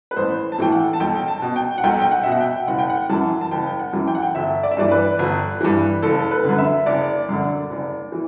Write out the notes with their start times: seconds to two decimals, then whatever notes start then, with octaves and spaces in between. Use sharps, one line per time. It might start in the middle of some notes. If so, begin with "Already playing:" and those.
0.11 B4
0.16 A1 C5
0.52 A5
0.58 A2 E3 G5
0.72 F#5
0.93 A5
1.00 B1 G5
1.28 A5
1.42 B2
1.56 G5
1.78 F#5
1.84 B1 G5
2.02 G5
2.11 F#5
2.24 B2 E5
2.32 F#5
2.40 G5
2.68 F#1 F#5
2.79 G5
2.90 F#5
3.09 F#2 E3 A5
3.41 A5
3.51 F#1 G5
3.79 F#5
3.93 F#2 E3
4.07 G5
4.15 F#5
4.22 G5
4.35 G1 E5
4.63 D5
4.71 E5
4.77 G2 E3 D5
4.91 B4
5.19 G1
5.61 G2 E3
6.02 F#1 A4
6.31 B4
6.44 F#2 D3
6.58 E5
6.86 F#1 D5
7.29 F#2 D3
7.70 F#1
8.12 E3